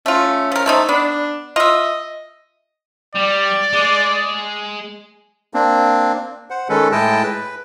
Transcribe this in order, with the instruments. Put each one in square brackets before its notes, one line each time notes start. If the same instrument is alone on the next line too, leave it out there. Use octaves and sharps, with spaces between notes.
[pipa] A3 F4 [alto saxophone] C#4
[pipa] F3 A#4
A3 C4 D#4
[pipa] B3 [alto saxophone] D4
[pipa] F4 E5 [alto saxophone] D#5
[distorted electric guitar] G3 [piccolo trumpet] D5
[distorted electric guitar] G#3
[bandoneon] A#3 C4 D4
C5 F#5
D#3 G#3 C#4 A4 B4
A2 G#3 E4 D#5 G5 A5
B4